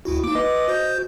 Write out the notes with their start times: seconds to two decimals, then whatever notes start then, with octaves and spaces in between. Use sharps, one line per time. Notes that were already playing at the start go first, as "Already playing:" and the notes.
0.05 D2 E4 F#4
0.24 A#3 D#4 D6
0.35 B4 D#5 D6
0.68 F#4 C5 G6